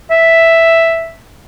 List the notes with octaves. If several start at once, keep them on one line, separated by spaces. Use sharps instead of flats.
E5